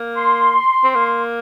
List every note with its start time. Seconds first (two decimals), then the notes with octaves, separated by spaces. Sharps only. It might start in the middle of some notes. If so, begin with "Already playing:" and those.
Already playing: A#3
0.17 C6
0.84 C4
0.95 A#3